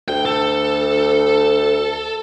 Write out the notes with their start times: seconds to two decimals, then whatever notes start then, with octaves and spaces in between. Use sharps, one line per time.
0.08 D2 G5
0.25 A4